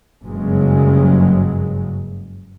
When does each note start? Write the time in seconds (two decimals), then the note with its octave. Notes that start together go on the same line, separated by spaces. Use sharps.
0.22 F#1 G2 C#3 F#3 G#3